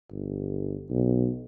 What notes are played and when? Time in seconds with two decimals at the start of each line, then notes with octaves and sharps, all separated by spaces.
0.11 G1
0.90 B1